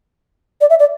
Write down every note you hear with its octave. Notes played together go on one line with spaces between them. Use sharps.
D5
E5
D5